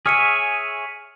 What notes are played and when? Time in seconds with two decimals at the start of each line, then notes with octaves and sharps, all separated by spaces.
0.06 G#4 C#5 E5 F6 C#7 D#7